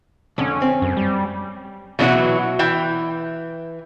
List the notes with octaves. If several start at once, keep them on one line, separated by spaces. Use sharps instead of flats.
F2 D3 C#4
C4
F#2
G3
B2 E3 F#3 D4 E4 F#4
E3 E4 G5